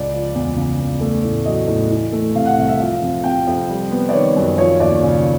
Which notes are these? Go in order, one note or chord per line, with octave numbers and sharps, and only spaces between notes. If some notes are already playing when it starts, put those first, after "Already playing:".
Already playing: C#2 D5
F3
E2
C#3
E2
A3
A2
F#3 D#5
A2
E3
A3
C3 F5
F#5
C2 F5
E5
F3 F5
F2
C3 G5
F2
G3
B3
D5
D#3 C#5
F#2
F3 C#5
D#2 D5
C#3